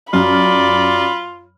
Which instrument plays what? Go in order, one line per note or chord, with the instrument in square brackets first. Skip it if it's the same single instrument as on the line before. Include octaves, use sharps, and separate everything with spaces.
[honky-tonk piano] F#2 F6 [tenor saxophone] F4 [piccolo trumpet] D5 [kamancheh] B5